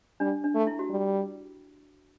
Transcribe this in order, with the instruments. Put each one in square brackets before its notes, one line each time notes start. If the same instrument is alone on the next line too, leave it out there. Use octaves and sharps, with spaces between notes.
[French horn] G3 [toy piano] D4
[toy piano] D4
[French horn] A3
[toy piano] E4
F#4
[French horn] G3